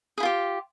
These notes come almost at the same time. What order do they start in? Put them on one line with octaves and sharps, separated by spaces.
G#4 E4 F4 G4